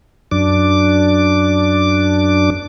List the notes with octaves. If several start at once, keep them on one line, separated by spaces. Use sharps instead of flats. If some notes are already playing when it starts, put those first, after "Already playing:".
F#2 D4 D6